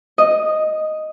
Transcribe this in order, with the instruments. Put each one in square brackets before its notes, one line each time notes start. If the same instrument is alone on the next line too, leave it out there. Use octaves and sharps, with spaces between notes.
[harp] D#5